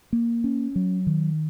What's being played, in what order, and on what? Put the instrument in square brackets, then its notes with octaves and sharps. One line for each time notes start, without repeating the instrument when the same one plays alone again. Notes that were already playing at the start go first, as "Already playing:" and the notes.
[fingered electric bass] A#3
C#4
F#3
D#3